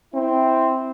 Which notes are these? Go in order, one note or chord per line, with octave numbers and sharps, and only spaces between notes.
C4 E4